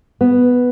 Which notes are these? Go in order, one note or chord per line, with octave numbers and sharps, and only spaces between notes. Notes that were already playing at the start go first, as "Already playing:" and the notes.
B3